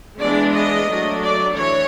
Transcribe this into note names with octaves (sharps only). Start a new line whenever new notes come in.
E3 G#3 B3 D4 D5
D#5
F#3 A3 D4
D5
E3 C#5